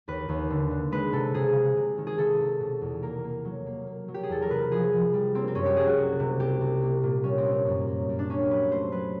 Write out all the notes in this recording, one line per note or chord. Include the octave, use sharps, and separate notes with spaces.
D#2 B4
D#2
D3
D3
G#3 B4
C3 A4
C3 G#4
G#3
C3
D#3
G#4
D#3 A4
C3
B2
E2
A#3 A#4
A#3
F#3
A#3
A#3
F#3
G4
G#4
E2 A4
A#4
C3 B4
F3 G#4
F3
G3
A#3 C4
C4
F#2 C#4
G4
G3 G#4
F#4
C2
C3
C2 G4
C2
A#3
A#2
G3 C#4
C4
A#3
C#4
F#2
F#2
F#2
D4
A#3 C#4
G4
F#3 B4
A3 C5
F#3 B4